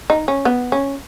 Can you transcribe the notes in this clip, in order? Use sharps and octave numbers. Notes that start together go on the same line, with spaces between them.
D#4
C#4
B3
C#4